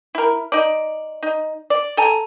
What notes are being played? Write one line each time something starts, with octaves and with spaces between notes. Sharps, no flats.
E4 A#4
D#4 D5
D#4
D5
A4 G#5 A#5